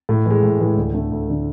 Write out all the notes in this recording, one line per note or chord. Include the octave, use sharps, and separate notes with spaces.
A2
E3 G#3
A2
E3 G#3
D2
D3 A3
D2
D3 A3